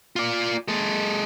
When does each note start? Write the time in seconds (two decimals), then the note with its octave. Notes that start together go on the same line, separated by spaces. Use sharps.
0.16 F4 D5
0.68 G#3 A4